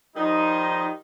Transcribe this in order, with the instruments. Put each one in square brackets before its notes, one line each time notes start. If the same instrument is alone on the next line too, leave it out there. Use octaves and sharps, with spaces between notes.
[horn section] D#3 F3 G3 D#4